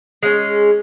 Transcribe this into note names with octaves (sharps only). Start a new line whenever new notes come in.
G#3 C#4